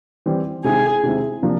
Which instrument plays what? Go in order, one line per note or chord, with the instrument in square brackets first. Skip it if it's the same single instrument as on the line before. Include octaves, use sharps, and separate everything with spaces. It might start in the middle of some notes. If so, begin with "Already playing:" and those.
[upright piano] E3 G3 C4
[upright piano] C3 D#3 G#3 C4 E4 [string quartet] G#4
[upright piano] C3 D#3 G#3 C4 E4
C3 F3 A#3 D4